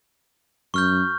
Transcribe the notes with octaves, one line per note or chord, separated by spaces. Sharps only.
F#2 C#6 F6 G6